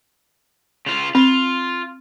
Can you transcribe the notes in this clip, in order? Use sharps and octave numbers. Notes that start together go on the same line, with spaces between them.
C#3 F4
C4 F4